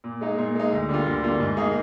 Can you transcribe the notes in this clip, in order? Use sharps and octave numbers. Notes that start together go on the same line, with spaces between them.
A#2
G#3 D#4
A#2
G#3 D#4
D2
D3 G3 A#3 F4
D2
D3 G3 A#3 F4
G#2
D#3 A#3 D#4 G#4